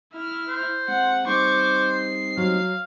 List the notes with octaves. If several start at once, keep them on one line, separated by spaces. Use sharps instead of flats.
E4 F6
C5
G#3 C4 F#5
G3 C4 D#4 C5 C#6 D6
C7
F#3 F5